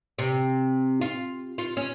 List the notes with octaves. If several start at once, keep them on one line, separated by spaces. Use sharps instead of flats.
C3
F4
F4
C#4